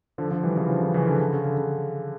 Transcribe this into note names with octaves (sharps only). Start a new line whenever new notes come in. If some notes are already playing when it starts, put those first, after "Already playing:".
D3 F3
D3 F3
E3 G3
C#3 E3
D3 F3
C#3 E3
C#3 E3
D3
D3
C#3
D3
C#3